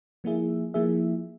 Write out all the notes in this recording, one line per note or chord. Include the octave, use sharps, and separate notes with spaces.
F3 A#3 E4 G#4 E5
F3 A#3 E4 G#4 E5